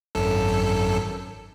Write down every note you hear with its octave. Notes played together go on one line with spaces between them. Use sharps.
G#1 F#2 A4